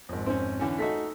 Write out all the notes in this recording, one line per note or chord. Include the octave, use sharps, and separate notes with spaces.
G#1 F2
C4 C#4
D3 E3 C#4
A3 D#4 F#4 A4 B6